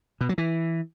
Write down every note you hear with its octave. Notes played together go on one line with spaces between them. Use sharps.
B2
F#3
E3